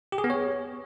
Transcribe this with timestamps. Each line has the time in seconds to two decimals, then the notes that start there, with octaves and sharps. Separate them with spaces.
0.12 G4
0.18 G#4
0.24 B3
0.30 C#5